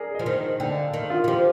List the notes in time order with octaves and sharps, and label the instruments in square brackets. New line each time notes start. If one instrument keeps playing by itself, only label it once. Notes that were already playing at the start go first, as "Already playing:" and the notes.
Already playing: [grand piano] G#4 A#4 D5
[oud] F3 [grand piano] D#5
[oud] D#3
[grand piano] D#5
[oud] D3 [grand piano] G5
[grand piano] F5
[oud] D#3
[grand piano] F4
[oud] D#3
[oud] F3 [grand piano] G4